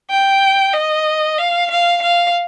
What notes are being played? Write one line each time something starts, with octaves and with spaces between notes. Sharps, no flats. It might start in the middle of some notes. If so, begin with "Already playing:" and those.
G5
D#5
F5
F5
F5